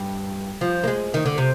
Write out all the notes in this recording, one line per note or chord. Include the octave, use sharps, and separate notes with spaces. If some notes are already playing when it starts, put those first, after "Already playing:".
Already playing: G2
F3
A#3
G#3
D#3
D3
C3